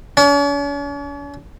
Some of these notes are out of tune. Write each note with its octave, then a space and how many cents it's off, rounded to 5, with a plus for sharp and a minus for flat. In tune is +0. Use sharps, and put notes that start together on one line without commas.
C#4 +45